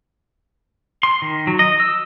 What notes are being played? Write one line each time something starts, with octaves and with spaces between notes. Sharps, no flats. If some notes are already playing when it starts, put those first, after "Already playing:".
C6
D#3
F#3
D#5
E6